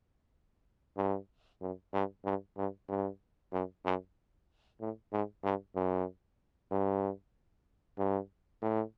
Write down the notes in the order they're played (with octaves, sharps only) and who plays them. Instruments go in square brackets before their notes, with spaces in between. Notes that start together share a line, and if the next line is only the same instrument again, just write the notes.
[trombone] G2
F#2
G2
G2
G2
G2
F#2
F#2
A2
G#2
G2
F#2
G2
G2
A2